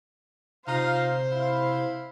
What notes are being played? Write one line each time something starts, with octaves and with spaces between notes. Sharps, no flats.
C3 D#4 F4 C5 F5
E4 F5